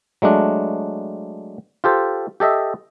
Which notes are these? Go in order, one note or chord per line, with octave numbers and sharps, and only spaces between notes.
F#3 G#3 A3 D4
F4 G4 A4 C5
G4 A4 D#5 E5